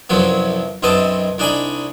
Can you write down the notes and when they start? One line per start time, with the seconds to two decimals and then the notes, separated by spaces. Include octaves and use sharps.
0.09 C2 F#2 F3 F#3 B3
0.83 B1 F#2 B3 C4 D#5 A5
1.38 C2 D4 D#4 G#5 B5